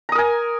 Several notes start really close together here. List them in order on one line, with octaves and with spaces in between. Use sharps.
A#5 D#6 A#4 G#5